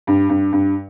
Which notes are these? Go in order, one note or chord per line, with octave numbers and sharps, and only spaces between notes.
G2
G2
G2